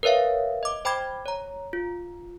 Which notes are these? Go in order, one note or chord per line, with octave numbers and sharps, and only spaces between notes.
A#4 B4 C#5 E5 F5
D#5 D6
C5 G5 B5 D6 G#6
C#5 A#5
F4